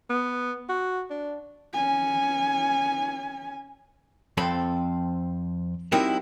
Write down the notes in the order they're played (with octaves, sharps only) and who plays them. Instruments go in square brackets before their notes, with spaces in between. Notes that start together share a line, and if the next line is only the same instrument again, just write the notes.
[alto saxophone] B3
F#4
D4
[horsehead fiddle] C#4 G#5
[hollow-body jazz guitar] F2 C4 A4 B5
G3 C4 D#4 E4 F#4 A#4